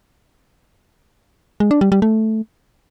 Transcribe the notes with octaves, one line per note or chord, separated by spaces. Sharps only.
G#3
D4
G3
G3
A3